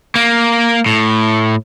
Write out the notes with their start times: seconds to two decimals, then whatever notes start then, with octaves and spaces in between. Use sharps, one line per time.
0.15 A#3
0.86 A2